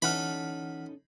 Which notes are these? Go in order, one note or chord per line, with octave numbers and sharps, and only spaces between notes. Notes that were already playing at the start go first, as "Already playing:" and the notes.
E3 C#4 D#4 A4 F#5 B5 F6